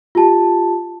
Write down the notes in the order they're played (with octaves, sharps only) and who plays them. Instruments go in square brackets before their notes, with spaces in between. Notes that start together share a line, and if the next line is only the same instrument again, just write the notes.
[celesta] F4 G4 A5